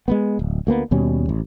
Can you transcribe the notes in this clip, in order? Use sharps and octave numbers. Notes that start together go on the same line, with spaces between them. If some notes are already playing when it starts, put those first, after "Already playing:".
G#3 A#3 B3
D1
D2 A#3 B3
D#2 B2 G3 C#4
A1